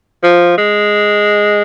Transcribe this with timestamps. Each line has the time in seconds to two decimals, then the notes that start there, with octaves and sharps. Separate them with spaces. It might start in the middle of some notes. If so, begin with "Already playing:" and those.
0.24 F3
0.58 G#3